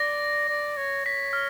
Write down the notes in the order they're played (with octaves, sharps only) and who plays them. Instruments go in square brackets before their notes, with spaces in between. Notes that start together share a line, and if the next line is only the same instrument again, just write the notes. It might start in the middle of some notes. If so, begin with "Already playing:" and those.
Already playing: [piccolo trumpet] D5 [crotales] A#6
[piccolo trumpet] D5
C#5
[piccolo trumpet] C#5 [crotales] B6
[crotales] F6